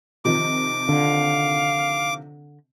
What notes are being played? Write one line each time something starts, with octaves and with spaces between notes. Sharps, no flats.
C3 D#3 F3 D6
D3 F5